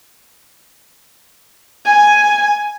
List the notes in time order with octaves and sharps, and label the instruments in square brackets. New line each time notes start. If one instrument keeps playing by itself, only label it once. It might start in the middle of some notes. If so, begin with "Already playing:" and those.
[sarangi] G#5